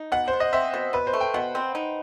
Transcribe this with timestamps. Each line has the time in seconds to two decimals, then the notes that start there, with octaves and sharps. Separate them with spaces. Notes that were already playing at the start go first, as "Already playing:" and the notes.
Already playing: D#4
0.12 B2 F#5
0.28 C5
0.33 B2
0.40 D#5
0.53 C4 E5
0.74 B2
0.93 B2 B4
1.07 C5
1.13 A3
1.21 G5
1.34 B2 F#5
1.55 C4
1.75 D#4